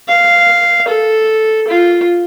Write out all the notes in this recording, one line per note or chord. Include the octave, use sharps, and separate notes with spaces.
F5
A4
F4